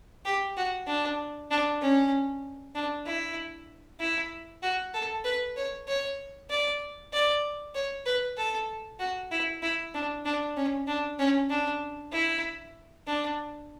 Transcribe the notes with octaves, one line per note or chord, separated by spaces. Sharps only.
G4
F#4
D4
D4
C#4
D4
E4
E4
F#4
A4
B4
C#5
C#5
D5
D5
C#5
B4
A4
F#4
E4
E4
D4
D4
C#4
D4
C#4
D4
E4
D4